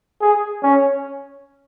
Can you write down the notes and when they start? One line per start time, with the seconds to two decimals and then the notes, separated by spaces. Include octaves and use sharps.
0.21 G#4
0.63 C#4